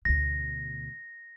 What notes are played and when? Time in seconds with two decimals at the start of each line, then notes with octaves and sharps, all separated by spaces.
0.05 D2 B2 A#6